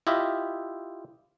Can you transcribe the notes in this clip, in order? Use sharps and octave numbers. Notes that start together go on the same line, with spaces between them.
E4 F4 G4 D#5 E5